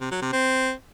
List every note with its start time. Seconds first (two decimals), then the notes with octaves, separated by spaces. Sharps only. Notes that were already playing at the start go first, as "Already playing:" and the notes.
0.01 C3
0.11 F#3
0.22 C3
0.33 C4